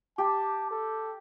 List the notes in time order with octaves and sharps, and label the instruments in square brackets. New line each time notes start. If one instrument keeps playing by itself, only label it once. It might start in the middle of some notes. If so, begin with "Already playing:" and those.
[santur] G4 [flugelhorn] A5
[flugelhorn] A4